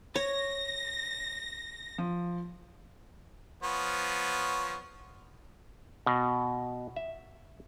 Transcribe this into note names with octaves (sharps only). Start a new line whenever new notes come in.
C#5 A#6
F3
F3 B3 C#5
B2
E5